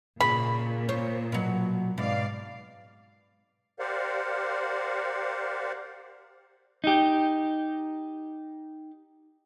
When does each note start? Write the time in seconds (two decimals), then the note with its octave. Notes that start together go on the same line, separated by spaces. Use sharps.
0.20 A#2 C#3 B5
0.89 C5 C#5
1.32 B2 F#3
1.98 G#2 B2 D5 F5
3.79 G4 A#4 C5 D5 F5 F#5
6.84 D#4 G4